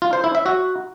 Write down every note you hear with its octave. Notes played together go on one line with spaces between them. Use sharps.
F4
C5
E4
E5
F#4